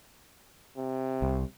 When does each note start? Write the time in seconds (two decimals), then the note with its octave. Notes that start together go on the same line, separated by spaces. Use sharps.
0.77 C3
1.22 C2